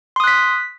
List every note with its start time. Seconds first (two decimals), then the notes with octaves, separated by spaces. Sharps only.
0.16 C6
0.20 D#6
0.24 F#6
0.27 B6